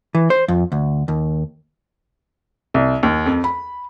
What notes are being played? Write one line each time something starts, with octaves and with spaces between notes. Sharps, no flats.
E3
C5
F2
D2
D#2
C2
D#2
F2
B5